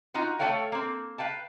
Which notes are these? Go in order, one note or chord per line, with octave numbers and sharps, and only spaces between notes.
D#4 F4 F#4
A3 A#3 A4 C#5 F5 G5
A#3 C4
B4 F5 G5 A5